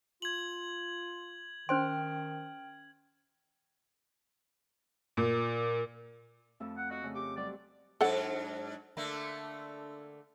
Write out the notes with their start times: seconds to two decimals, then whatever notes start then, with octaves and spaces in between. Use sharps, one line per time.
0.22 F4 G#6 F#7
1.69 D#3 C#4 C5 G5 C6 F6
5.17 A#2
6.60 F2 A3 E4
6.77 F#5
6.90 F#4 D#5
7.04 C#3 A3
7.15 G4 D6
7.36 F#3 G3 C5 D5
8.01 G#2 F#3 D4 A4 D5 F#5
8.97 D3 A3 A#3